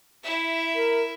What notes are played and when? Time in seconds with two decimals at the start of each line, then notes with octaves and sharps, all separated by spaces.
0.23 E4 E5
0.75 A#4